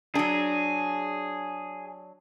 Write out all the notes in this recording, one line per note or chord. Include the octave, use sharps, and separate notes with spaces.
F#3 D4 G#4